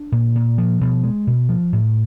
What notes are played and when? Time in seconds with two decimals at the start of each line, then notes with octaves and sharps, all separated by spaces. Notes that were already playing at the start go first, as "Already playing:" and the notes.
Already playing: D4
0.12 A#2
0.35 A#2
0.58 F3
0.81 B2
1.04 G#3
1.27 B2
1.49 F3
1.73 A2